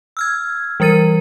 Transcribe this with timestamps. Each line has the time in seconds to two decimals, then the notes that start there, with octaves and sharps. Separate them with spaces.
0.17 E6 F6 G#6
0.80 E3 G3 A#4 A6 D#7